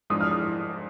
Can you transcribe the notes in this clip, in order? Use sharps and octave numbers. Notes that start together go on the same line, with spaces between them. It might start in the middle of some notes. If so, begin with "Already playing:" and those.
G#2 F3 G#3 D4 D#6
F6
D#6